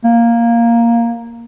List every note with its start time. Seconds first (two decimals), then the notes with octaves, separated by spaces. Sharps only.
0.04 A#3